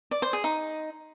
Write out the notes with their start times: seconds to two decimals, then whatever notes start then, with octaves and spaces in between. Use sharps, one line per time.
0.11 D5
0.22 C5
0.33 G#4
0.44 D#4